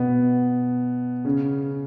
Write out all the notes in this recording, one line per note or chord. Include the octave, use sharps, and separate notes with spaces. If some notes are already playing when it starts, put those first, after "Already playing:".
Already playing: B2 B3
C#3 C#4